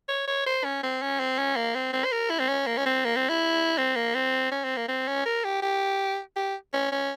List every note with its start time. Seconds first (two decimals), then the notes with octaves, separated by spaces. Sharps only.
0.08 C#5
0.27 C#5
0.46 C5
0.64 C#4
0.83 C4
1.02 C#4
1.19 C4
1.38 C#4
1.56 A#3
1.75 C4
1.93 C4
2.04 C5
2.12 A#4
2.30 E4
2.40 C4
2.48 C#4
2.67 A#3
2.77 C#4
2.86 C4
3.05 A#3
3.16 C4
3.29 E4
3.78 C4
3.96 A#3
4.15 C4
4.51 C#4
4.64 C4
4.77 A#3
4.88 C4
5.08 C#4
5.26 A#4
5.44 G4
5.62 G4
6.36 G4
6.73 C#4
6.92 C#4